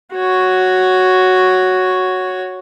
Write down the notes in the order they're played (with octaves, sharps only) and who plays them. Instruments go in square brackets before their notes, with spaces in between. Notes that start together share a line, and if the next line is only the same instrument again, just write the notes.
[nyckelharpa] F#4 C#5